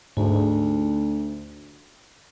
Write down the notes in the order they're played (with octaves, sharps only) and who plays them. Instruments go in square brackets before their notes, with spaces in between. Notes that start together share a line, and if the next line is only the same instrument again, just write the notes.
[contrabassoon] D2 [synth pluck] G#2